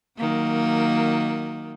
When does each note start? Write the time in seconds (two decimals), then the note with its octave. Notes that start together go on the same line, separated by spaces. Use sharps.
0.17 D#3 F#3 A#3